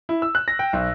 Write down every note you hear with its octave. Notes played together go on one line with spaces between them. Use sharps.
E4
E6
F#6
A#6
G5
B1